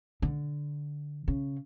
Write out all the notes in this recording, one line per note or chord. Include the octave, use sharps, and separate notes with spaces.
D3
C#3